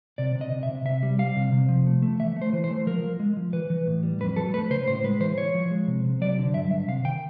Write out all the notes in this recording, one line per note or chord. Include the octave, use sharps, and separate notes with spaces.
C3 D5
C3
D#5
C3
E5
C3
C3 E5
G3
G3 F5
C3
C3
F3
A3
A3
E3 E5
A3
C5
E3
C5
A3
F3 A#4
F3
G#3
F3
E3 B4
E3
A2
G3
F2 B4
F#3 A4
A3 B4
C#3 C5
A2 C5
G#3 B4
E3 C5
E3 C#5
F3
G#3
C3
C3
F#3 D5
D3
G2 E5
G2 E5
C3 F5
D#3 G5